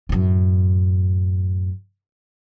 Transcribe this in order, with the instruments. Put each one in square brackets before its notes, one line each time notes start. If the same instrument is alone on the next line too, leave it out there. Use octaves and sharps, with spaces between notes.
[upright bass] F#2 A2